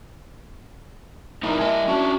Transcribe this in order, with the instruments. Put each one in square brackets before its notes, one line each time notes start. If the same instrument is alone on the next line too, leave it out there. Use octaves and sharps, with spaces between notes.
[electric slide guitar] B3 C4 D#4 [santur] E4 A#4 D5
[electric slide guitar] G3 D#5 [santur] A#4 G#5 A5
[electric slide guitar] C#4 D4 [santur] F#4